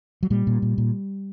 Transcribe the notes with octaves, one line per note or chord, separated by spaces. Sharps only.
F#3
A#2 G3
A#2
A#2
A#2